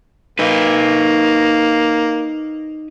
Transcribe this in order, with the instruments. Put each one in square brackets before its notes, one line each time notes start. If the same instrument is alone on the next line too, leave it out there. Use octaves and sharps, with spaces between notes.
[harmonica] A#3 [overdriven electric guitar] D#4 B4